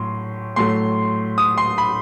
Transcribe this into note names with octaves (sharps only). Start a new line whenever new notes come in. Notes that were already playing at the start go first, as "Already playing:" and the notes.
Already playing: A2 F#3 C6
A2 F#3 A3 C6
D#6
C6
B5